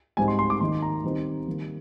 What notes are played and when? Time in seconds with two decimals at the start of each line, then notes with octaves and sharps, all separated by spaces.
0.17 G#2 G3 C4 D#4 G#5
0.28 C6
0.39 C6
0.50 D6
0.61 D#3 A#3 D#4 C6
0.82 A#5
1.04 D#3 G3 C4 D#4
1.47 D#3 G3 A#3